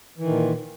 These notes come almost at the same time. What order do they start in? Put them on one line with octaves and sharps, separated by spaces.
E3 D#3 A#2